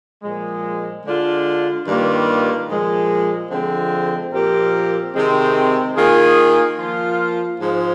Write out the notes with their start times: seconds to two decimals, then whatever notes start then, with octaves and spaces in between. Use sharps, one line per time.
0.23 A#2 F3 G#3
1.05 D3 G#3 D4 F4
1.87 G2 D#3 G3 A#3 F4
2.68 A#2 F3 G#3
3.50 D3 F3 G#3 C4
4.32 A#2 F3 C4 G4 A#4
5.15 C3 D#3 G#3 C4
5.96 D#3 A#3 F4 G#4
6.78 F3 A#3 F4
7.59 G#2 F3 G#3